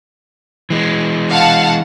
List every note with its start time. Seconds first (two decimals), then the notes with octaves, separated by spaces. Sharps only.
0.70 E3 G#3
1.30 F5 F#5 A5